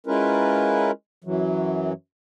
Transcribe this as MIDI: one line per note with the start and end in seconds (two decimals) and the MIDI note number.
0.06 0.91 56
0.06 0.91 61
0.06 0.91 64
0.06 0.91 65
0.06 0.91 70
0.06 0.91 71
1.24 1.93 42
1.24 1.93 52
1.24 1.93 54